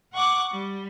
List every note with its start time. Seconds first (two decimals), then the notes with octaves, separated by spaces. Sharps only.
0.14 F#5 C#6 D6 F#6
0.52 G3